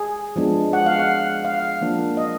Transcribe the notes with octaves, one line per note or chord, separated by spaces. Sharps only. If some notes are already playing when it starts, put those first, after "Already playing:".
Already playing: G#4
F3 G#3 B3 D4
F#5
F5
F#5
F5
F3 A#3 D4
D#5